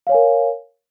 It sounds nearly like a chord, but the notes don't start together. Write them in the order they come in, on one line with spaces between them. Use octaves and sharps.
F5 C#5 G#5 A#4